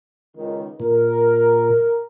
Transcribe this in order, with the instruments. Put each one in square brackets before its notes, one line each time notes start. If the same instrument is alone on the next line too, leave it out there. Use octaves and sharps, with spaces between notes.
[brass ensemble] C#2 D#3
[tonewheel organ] A#2 [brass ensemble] A#4